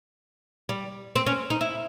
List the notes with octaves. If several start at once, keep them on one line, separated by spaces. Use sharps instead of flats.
G3
C4
C#4
D#4
E4